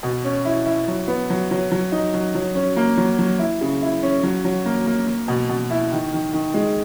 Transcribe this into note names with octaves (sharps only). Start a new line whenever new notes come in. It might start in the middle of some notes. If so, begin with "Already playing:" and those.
B2
C#4
E4
E4
F#3
B3
F#3
F#3
F#3
D#4
F#3
F#3
C#4
A#3
F#3
F#3
E4
C#3
E4
C#4
F#3
F#3
A#3
A#3
A#3
B2
B2
E4
D#3
D#3
D#3
G#3